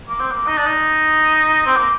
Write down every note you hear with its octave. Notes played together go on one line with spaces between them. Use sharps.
A#3
C4
A#3
D#4
D4
D#4
C4
A#3